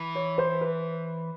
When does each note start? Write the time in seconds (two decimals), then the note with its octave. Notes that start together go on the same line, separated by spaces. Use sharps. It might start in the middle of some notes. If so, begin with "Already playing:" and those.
Already playing: E3
0.15 C#5
0.38 C5
0.61 B4